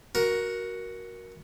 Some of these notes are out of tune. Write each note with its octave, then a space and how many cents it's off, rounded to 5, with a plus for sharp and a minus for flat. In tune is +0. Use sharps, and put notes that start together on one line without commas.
F#4 +0 A#4 +10